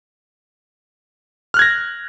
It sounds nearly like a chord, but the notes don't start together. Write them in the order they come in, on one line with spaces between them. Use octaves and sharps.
F6 F#6 G#6 A#6